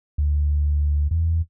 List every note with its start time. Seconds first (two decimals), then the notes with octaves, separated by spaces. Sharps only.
0.18 D2
1.11 E2